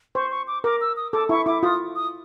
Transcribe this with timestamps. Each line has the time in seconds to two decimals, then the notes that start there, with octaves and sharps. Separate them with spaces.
0.15 C5 C#6
0.31 C#6
0.47 D6
0.64 A#4 D6
0.81 E6
0.97 D#6
1.13 A4 D6
1.29 E4 C#6
1.46 E4 D6
1.62 F4 D#6
1.96 D#6